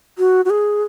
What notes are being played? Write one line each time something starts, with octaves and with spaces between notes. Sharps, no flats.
F#4
F#4
G#4